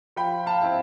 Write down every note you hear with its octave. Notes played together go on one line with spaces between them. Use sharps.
F3 G5 B5
F5 A5
C4 E4